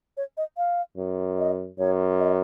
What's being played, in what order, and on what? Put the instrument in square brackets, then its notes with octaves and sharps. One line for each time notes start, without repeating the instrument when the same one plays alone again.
[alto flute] C#5
D#5
F5
[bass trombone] F#2
[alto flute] D#5
[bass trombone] F#2 [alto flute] C#5
[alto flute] D#5